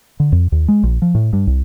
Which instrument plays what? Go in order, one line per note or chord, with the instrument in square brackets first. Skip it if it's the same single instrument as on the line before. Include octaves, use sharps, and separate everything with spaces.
[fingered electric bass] D3
F2
D#2
G#3
A#1
F3
A2
G2
C2